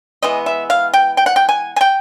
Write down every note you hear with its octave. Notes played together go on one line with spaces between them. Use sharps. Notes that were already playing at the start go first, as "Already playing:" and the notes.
E3 G#3 B3 D#5
E5
F5
G5
G5
F#5
G5
G#5
G#5
G5